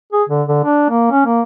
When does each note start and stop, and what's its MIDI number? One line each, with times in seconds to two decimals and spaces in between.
0.12 0.23 68
0.29 0.43 50
0.48 0.60 50
0.64 0.85 62
0.90 1.07 58
1.11 1.25 61
1.26 1.41 58